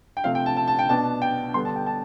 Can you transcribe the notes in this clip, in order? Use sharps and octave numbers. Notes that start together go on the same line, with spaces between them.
G5
C3 F3 A3 C4 F5
G5
A5
A5
A5
G5
B2 B3 D4 A5
G5
D3 G3 B3 D4 C6
A5
G5
A5